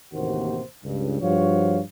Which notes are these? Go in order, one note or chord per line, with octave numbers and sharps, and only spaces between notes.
A1 D#2 C3 A#3 F#4 C5
C#2 G2
G2 F3 F#4 C5 C#5 F5